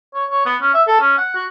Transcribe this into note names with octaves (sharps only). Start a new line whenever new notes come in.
C#5
C#5
B3
C#4
E5
A4
C#4
F#5
F#4